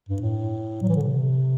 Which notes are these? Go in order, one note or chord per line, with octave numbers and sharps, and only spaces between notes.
G2
A2
F#3
E3
D3
C3